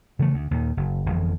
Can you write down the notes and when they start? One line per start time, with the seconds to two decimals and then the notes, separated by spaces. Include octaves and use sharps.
0.19 C#3 E3 G3 A3
0.34 D2
0.51 D#2 A#2 D#3
0.77 F#1
1.06 G1 F2 E3 F3